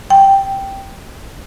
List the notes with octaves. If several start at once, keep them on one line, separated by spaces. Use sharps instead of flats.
G5